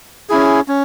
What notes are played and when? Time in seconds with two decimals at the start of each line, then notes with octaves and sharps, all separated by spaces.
0.29 C#4 E4 G#4
0.68 C#4